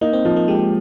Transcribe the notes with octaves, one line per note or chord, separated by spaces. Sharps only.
A#3 D#4
C4
F3 A#3
A#3
G#3 G4